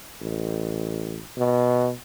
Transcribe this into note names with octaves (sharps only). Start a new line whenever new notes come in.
A1
B2